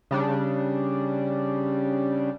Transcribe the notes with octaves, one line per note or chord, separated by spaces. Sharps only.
C#3 G3 D4